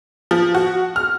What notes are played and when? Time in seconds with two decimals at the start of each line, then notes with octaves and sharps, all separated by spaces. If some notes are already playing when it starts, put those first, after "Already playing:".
0.31 F3
0.55 F#4
0.96 F6